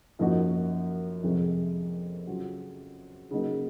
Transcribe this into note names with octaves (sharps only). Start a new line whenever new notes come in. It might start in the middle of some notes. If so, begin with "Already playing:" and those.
F#2 F3 A#3 D#4 F#4
F2 C3 F3 G#3
C#3 F#3 C#4 F4
C#3 F#3 A#3 D#4 F#4